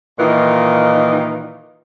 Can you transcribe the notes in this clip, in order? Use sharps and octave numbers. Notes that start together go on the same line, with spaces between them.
A#2 D#3 E3 D#4 F4